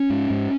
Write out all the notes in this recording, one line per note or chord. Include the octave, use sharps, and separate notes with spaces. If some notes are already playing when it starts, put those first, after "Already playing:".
Already playing: C#4
G#2
G#2